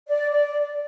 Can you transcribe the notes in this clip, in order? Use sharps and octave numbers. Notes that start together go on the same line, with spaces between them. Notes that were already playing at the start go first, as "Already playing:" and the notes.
D5
D5